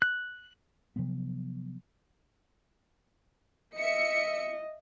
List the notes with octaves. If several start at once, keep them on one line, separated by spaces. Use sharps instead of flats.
F#6
C3 F3 F#3 B3
D#5 E5 C#7